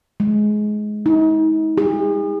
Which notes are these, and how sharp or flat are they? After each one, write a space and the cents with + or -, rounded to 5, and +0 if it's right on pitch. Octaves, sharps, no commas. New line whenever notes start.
G#3 +25
D#4 +40
G#4 -45